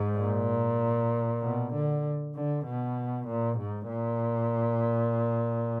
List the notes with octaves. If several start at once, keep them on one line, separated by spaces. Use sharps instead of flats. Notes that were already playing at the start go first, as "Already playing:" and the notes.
Already playing: G#2
A#2
B2
D3
D3
B2
A#2
G#2
A#2